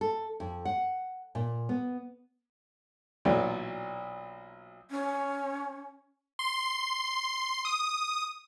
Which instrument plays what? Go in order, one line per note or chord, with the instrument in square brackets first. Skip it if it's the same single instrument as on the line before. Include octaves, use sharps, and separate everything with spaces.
[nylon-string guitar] A4
F2
F#5
A#2
B3
[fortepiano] B1 A#2 E3 F#3 C#5 D5
[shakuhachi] C#4
[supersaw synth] C6
D#6